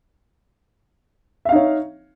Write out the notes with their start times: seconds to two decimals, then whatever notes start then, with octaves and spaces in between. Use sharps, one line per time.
1.45 E5
1.49 F5
1.52 D#4
1.56 C#5